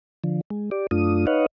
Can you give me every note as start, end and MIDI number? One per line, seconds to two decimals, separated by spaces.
0.24 0.41 50
0.24 0.41 53
0.50 0.70 56
0.71 0.87 67
0.71 0.87 74
0.91 1.26 42
0.91 1.26 57
0.91 1.26 62
0.91 1.26 65
0.91 1.26 87
1.27 1.46 63
1.27 1.46 71
1.27 1.46 73
1.27 1.46 75
1.27 1.46 77
1.27 1.46 78